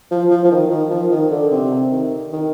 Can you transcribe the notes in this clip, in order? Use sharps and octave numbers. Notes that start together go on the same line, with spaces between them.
F3
F3
F3
D#3
D#3
F3
D#3
D3
C3
D#3
D#3